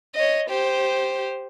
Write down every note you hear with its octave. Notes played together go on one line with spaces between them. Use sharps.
C#5 D#5
G4 C5